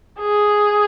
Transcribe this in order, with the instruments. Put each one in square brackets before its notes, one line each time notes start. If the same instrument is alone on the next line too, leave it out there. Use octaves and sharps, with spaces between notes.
[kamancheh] G#4